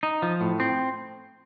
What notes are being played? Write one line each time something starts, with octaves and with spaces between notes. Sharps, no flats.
D#4
F3
A2
C4